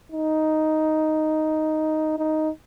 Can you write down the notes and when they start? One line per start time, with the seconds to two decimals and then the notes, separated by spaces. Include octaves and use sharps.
0.12 D#4
2.19 D#4